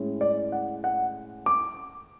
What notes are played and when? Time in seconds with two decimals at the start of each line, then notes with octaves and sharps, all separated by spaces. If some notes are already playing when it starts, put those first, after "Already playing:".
Already playing: A2 G#3 C#4 E4
0.21 D5
0.52 F#5
0.84 F#5
1.46 D6